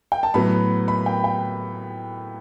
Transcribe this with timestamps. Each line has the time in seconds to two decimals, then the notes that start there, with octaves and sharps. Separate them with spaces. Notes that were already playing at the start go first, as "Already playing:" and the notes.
0.12 G5
0.23 A5
0.34 A2 F#3 B3 B5
0.88 B5
1.06 G5
1.24 G5